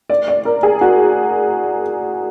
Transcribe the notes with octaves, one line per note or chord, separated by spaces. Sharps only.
D5
D5
A#4
G#4
F#4